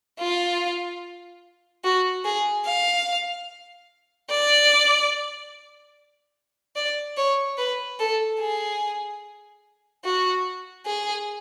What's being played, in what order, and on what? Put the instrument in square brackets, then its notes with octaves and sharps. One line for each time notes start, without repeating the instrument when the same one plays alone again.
[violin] F4
F#4
G#4
F5
D5
D5
C#5
B4
A4
G#4
F#4
G#4